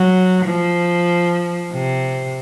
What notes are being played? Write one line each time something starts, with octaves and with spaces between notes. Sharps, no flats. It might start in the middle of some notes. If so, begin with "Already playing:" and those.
Already playing: F#3
F3
C3